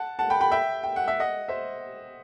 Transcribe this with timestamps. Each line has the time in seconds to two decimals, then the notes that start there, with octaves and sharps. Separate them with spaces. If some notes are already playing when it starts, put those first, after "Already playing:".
Already playing: F#5 A5
0.19 F#5 A5
0.30 G5 B5
0.41 G5 B5
0.52 E5 G5
0.83 G5
0.96 F#5
1.08 E5
1.20 D#5 F#5
1.48 C5 E5